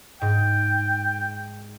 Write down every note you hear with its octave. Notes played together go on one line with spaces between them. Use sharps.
G#2 G5